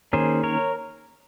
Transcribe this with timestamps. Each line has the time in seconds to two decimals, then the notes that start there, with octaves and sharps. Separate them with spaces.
0.13 D#3 A#3 C#4 G#4 C5
0.43 A#4 C#5